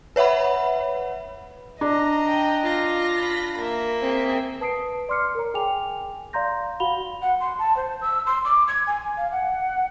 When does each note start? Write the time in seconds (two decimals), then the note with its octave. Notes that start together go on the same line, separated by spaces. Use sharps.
0.16 B4 C#5 E5 F#5 B5
1.81 D4 D#5 A#5
2.26 G5
2.64 F4 A#6
3.19 B5
3.58 A#3 E5
4.01 C4 G#4
4.60 B4 A5 D#6 C7 D7
5.09 D5 C6 D6 F6 C7 C#7
5.35 A#4 C#5 A#5
5.54 G#4 G5 G#5 D6 F7
6.33 D5 F5 A#5 C6 G6 A#6
6.80 F#4 F5 F#5 B5 F7 G7
7.22 F#5
7.40 C6
7.59 A5
7.77 C5
8.01 E6
8.26 C6
8.45 D6
8.68 G#6
8.87 G#5
9.17 F5
9.32 F#5